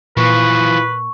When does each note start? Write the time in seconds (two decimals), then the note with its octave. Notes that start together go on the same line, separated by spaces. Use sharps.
0.17 A#2 E3 F3 B4 C#6